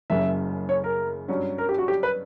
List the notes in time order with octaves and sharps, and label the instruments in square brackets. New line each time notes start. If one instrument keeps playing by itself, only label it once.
[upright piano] F#1 F#2 C#3 [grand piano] E5
[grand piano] C#5
A#4
[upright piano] G2 F#3 C#4
[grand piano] A#4
G4
F#4
G4
B4